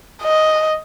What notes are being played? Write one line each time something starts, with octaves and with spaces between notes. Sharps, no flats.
D#5